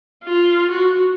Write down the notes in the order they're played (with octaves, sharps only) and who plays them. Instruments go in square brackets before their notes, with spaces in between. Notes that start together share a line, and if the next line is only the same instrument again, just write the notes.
[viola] F4
F#4